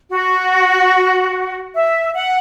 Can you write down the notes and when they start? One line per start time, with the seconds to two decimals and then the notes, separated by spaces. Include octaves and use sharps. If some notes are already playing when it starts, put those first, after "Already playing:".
0.11 F#4
1.74 E5
2.14 F#5